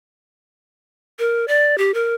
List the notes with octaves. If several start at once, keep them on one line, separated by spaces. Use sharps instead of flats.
A#4
D5
G4
A#4